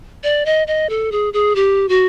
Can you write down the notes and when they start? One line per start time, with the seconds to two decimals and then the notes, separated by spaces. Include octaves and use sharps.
0.23 D5
0.46 D#5
0.67 D#5
0.89 A4
1.12 G#4
1.33 G#4
1.56 G4
1.89 F#4